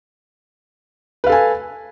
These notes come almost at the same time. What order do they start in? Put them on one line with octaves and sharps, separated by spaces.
B4 F5 A4 G#5